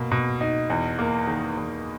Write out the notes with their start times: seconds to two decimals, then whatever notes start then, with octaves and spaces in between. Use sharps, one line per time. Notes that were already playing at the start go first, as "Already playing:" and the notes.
Already playing: B2 A#3
0.11 B2
0.41 D#4
0.70 E2
0.99 A#3
1.27 D#3
1.57 E2